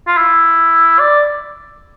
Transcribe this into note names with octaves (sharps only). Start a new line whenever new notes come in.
F4
E4
D5